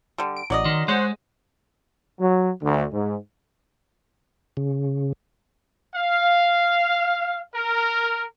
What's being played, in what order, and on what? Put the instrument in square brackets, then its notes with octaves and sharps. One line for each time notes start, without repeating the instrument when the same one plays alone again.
[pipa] D3 G3
[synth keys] D7
[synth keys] A1 [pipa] F#3 D5 D#5
[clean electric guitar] D#3 [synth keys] C6
[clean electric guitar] G#3 [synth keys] C5 C#5 F#5
[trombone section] F#3
D2
G#2
[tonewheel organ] C#3
[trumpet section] F5
A#4